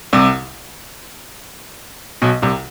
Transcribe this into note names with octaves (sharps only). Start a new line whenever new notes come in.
C2 C3
B1 B2
C2 C3